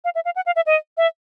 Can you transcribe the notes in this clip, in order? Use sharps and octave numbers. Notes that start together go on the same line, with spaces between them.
F5
E5
F5
F#5
F5
E5
D#5
E5